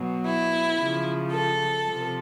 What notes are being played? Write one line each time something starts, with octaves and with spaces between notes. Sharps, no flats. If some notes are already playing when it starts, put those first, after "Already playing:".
Already playing: B2 F#3
E4
C#3 F3
A4
C3 F3